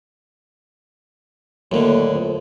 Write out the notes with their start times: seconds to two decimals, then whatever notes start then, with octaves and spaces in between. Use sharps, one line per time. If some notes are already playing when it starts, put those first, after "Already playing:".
1.72 D#2 A2 D3 F#3 A3 A#3
2.14 F2